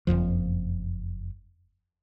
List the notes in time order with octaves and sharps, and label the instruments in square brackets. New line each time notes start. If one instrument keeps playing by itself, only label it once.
[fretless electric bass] F#1 C2 F2 F3